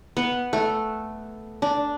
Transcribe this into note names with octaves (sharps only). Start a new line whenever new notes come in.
B3
A3
D4